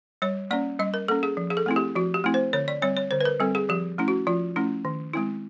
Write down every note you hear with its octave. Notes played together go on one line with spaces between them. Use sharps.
G3 C#5
A#3 C#4 D5
G3 D#5
A#4
A#3 C#4 A4
G#4
F3
G#4
A4
A3 C4 E4
G4
F3 F#4
G4
A3 C4 E4
C5
D3 C#5
D5
G3 C4 C#5
C#5
D3 C5
B4
A#4
G3 C4 A4
G#4
F3 G4
A3 C#4 E4
F#4
F3 F4
A3 C#4 E4
D#3
G#3 C4 E4